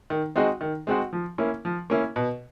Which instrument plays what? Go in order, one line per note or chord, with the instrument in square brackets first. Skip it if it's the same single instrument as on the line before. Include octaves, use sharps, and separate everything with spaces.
[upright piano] D#3
G#3 C4 D#4 F#4
D#3
G#3 C4 D#4 F#4
F3
A#3 C#4 E4
F3
A#3 C#4 E4
B2